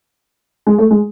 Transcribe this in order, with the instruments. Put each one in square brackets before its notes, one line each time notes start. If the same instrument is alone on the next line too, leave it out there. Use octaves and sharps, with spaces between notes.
[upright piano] G#3
A3
G#3